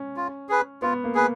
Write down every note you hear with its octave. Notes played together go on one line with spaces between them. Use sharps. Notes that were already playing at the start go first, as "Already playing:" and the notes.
Already playing: C#4
F4
G#4 B4
B3 F4
A#3
G#4 B4